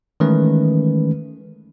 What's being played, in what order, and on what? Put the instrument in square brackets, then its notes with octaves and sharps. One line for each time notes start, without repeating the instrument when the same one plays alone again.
[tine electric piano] D#3 E3 G#3 A3 C#4 B4